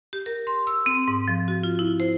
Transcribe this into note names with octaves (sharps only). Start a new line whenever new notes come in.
G4
A#4
C6
E6
C4
G#2
F3
F#4
F4
E4
C5